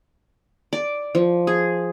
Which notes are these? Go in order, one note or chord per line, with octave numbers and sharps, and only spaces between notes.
D5
F3
G#4